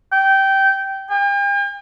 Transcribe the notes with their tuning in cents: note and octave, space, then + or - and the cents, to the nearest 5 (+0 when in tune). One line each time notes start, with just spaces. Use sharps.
G5 -15
G5 +45